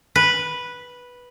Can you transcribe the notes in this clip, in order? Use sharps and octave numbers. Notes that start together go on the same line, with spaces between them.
B4